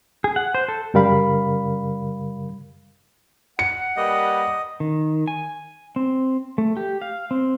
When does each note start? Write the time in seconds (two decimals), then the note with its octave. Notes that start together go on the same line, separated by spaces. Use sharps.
0.24 G#4
0.36 F#5
0.55 C5
0.68 A4
0.94 F#2 C#3 G3 A#4 F5 B5
3.59 F#5 C#7
3.97 G3 A#3 B4 D#5
4.80 D#3
5.28 G#5
5.96 C4
6.58 A3
6.77 G4
7.02 F5
7.31 C4